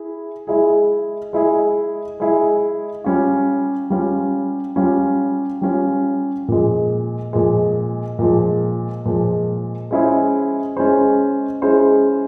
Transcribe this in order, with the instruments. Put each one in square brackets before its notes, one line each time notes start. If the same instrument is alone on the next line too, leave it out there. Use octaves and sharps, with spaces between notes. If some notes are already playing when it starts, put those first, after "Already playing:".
Already playing: [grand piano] E4 G#4
G#3 E4 G#4
G#3 E4 G#4
G#3 E4 G#4
G3 C#4 F4
G3 C#4 F4
G3 C#4 F4
G3 C#4 F4
A#2 F3 G#3
A#2 F3 G#3
A#2 F3 G#3
A#2 F3 G#3
G#3 C#4 E4 G#4 C5
G#3 C#4 E4 G#4 C5
G#3 C#4 E4 G#4 C5